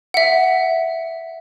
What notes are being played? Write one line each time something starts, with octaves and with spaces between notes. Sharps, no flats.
E5 F#5